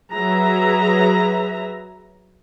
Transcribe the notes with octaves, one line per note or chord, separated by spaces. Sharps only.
F#3 G#4 B4 E5 A#5